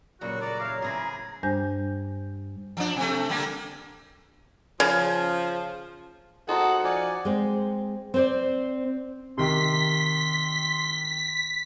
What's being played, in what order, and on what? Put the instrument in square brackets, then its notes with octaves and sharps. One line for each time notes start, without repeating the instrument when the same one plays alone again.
[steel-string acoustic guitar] A#2 C#3 G3 [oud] F#3 A#3 [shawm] F#4
[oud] A3 A4 A#4 [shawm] D5 [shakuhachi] A#5
[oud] E3 F#3 E4 [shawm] F5
[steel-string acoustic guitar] A2 C#3 C4 [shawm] G#4
[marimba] G2 G3 D4 C5 G#5 G6
[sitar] F3 D4
C3 A3
D3 G3 A#3
[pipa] C#3 [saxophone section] F3
[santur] D#4 F#4 D#6 [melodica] G#4 C5 [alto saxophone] A4 [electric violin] F#5
[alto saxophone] F3 [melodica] D5 G#5
[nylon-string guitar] G#3 C4
C4 C5 D5
[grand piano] C3 D#3 G4 [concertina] C6 [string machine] B6